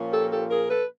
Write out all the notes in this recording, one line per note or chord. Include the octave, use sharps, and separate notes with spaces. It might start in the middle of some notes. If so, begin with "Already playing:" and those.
Already playing: A#2 F3 A#3 C#4
G4 A4
G4 A4
G#4 A#4
A4 B4